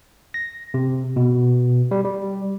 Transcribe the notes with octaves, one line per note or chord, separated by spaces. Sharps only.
A#6
C3
B2
G3
G3